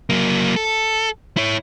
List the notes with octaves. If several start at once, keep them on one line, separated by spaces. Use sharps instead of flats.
F#3 A#3
A4
E4 C#5